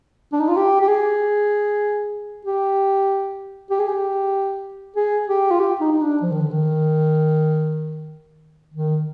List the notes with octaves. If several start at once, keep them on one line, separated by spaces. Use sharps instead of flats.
D4
D#4
F4
G4
G4
G#4
G4
G4
G#4
G4
G#4
G4
F4
G4
D#4
D#4
D4
F3
D#3
D3
D#3
D#3